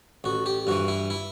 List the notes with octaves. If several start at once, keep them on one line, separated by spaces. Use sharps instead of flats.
A1 F#4
G4
G2 E3 F#4
E4
E4